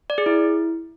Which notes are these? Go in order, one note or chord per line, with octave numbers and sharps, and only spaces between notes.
D5
G#4
E4